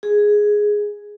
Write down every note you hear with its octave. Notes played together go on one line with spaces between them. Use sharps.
G#4